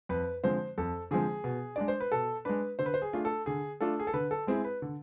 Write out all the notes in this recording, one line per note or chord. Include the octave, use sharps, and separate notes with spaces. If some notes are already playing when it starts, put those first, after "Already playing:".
F2 B4
D3 F3 G#3 C4 C5
F2 A4
D3 F3 G#3 C4 G#4
B2
G#3 D4 D5
C5
B4
B2 A4
G#3 D4 B4
D3 C5
B4
C5
G#4
A3 D4 F4
A4
D3 G#4
A3 D4 F4 A4
G#4
A4
D3 B4
A4
G#3 C4 E4 G#4
B4
D3